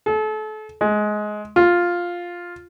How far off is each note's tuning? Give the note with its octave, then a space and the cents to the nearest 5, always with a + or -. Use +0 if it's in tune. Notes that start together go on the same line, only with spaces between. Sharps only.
A4 -35
G#3 +20
F4 +5